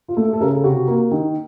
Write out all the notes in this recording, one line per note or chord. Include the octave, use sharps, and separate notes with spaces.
F4
A3 A4
A4
C#3 A#4
A4
C3 F#4
A#3
D#3